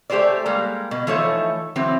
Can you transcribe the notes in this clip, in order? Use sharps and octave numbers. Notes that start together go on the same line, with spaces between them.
A3 G4 G#4 C5 D5
G3 G#3 A#3
B2
E3 F3 A3 D#4 C#5
E3 F#3 C4